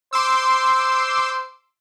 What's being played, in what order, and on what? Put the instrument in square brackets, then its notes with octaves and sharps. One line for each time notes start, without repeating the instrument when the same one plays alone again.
[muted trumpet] C5 [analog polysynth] C6 D6 E6